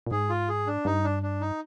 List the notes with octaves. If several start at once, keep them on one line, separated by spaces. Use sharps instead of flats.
A#2
G#2 G#4
F4
G#4
D4
G2 D#4
D4
D4
D#4